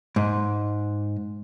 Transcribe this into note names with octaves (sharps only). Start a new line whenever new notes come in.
G#2